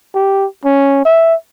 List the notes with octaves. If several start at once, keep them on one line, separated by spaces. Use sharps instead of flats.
G4
C#4
E5